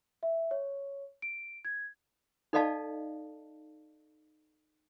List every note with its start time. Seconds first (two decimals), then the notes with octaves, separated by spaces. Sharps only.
0.23 E5
0.51 C#5
1.22 D7
1.65 G#6
2.53 D#4 A4 D5 D#5 F5 A5